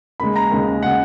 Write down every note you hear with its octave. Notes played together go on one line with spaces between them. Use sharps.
D#2 C#3 G#3 B5
A#5
D#2 C#3 G#3
C#3 G#3 F#5